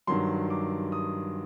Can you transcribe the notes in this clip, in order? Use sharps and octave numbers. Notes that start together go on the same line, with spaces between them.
G2 D#3 F#3 C6
D6
D#6